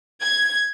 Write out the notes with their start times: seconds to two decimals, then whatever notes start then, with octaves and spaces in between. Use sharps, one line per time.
0.22 G#6